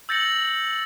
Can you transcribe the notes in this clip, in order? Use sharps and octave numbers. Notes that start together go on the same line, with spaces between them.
E6 G6 A6 A#6 C#7 F#7